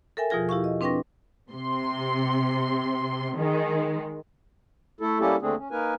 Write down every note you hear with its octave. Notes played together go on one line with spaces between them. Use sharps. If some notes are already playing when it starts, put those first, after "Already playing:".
A4 A#4 E5 G5 G#5
E2 B2 F3 F4 G#4 A#6
E4 G4 F5 C#6
D#5
C4 D4 B4 G5 C#6 A#6
C3 C6
D#3 G#3
A3 E4 A4
G3 A#3 C#4 E4 G4 A4
D#2 D3 A3 C4 D4 G#4
C#4
A#3 D#4 A#4 B4 G#5